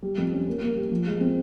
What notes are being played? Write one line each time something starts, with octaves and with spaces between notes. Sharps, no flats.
G3
F2
C#4
A#3
A#3
G3
F3
G#3
C4